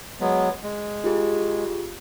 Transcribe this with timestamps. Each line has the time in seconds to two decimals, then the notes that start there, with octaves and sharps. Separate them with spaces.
0.20 F#3 G#3 B3
0.63 G#3
1.04 F4 G4 G#4